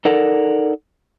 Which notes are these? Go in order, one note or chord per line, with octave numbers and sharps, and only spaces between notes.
D#4 A4 A#4 D5 F#5